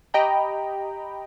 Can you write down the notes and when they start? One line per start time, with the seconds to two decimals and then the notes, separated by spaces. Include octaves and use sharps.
0.14 G4 D#5 G5 A#5 B5